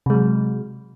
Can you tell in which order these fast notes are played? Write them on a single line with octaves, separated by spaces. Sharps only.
C3 G#3 F#3